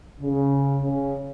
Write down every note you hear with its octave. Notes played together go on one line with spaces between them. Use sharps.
C#3
C#3